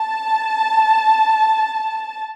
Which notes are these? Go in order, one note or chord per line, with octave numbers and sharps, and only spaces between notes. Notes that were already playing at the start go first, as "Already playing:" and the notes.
Already playing: A5